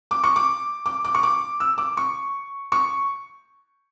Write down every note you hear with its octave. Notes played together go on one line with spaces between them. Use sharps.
D6
C#6
D6
D6
D6
C#6
D6
E6
D6
C#6
C#6